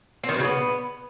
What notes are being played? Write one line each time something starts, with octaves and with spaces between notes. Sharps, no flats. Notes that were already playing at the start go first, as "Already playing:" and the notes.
C4
D#3
F#3
C#3
B3